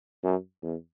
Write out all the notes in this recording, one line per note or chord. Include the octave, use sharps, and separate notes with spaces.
F#2
E2